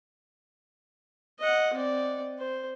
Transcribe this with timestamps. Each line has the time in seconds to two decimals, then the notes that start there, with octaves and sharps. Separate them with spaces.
1.39 D#5 F#5
1.74 C4 D5
2.39 C5